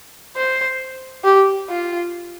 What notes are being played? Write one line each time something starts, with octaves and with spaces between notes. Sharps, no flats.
C5
G4
F4